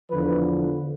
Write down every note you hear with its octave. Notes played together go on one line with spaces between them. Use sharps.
E2 D3 F3 B4